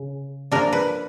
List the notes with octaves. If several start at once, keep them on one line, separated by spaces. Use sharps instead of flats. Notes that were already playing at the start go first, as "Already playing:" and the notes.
Already playing: C#3
F3 A#3 D4 A#4
B4